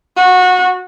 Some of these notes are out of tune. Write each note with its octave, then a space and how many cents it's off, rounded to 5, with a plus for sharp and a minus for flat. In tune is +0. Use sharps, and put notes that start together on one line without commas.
F#4 -20